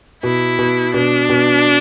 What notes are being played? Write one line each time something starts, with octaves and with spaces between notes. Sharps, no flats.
B2 E4
B2
B2 D4
B2